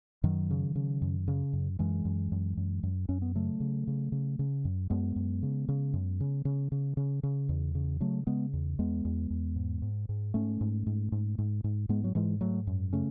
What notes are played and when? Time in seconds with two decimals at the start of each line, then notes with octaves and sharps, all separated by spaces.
0.23 F#2 D#3 F#3
0.50 C#3
0.75 C#3
1.02 F#2
1.28 C#3
1.53 F#2
1.79 F#2 E3 G#3
2.05 F#2
2.32 F#2
2.57 F#2
2.83 F#2
3.09 F#2 C#4
3.22 B3
3.35 C#3 F#3 A3
3.60 C#3
3.87 C#3
4.12 C#3
4.39 C#3
4.65 F#2
4.90 F#2 G#3 B3
5.16 F#2
5.43 C#3
5.68 C#3
5.93 F#2
6.20 C#3
6.45 C#3
6.72 C#3
6.97 C#3
7.23 C#3
7.49 E2
7.75 C#3
8.00 C#3 F#3 A3
8.27 C#3 G#3 B3
8.53 E2
8.79 E2 G#3 B3
9.05 E2
9.30 E2
9.56 G#2
9.82 G#2
10.09 G#2
10.34 G#2 A3 C#4
10.61 G#2
10.86 G#2
11.12 G#2
11.38 G#2
11.64 G#2
11.89 G#2 G#3 B3
12.04 F#3
12.15 G#2 E3 G#3
12.41 G#2 F#3 A3
12.67 F#2
12.93 C#3 A3 C#4